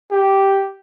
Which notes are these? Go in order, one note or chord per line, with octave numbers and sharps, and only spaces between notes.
G4